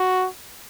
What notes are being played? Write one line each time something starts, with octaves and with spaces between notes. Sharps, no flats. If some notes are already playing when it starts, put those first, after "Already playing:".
Already playing: F#4